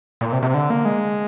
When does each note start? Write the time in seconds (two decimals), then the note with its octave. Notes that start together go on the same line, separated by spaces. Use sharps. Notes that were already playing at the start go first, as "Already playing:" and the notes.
0.21 A#2
0.32 C3
0.42 C3
0.54 D3
0.70 A#3
0.85 G#3